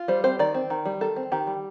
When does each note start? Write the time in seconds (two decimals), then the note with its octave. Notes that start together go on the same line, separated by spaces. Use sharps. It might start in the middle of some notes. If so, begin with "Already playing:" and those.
Already playing: F4
0.08 G3 C5
0.24 C4 C5
0.39 D#3 D5
0.54 C4
0.70 D#3
0.85 G3
1.01 D#3 A4
1.16 C4
1.32 D#3 G4
1.47 G3